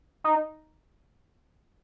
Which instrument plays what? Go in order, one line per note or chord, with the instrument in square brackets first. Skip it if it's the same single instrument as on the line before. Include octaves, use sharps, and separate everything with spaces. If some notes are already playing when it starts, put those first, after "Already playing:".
[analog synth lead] D#4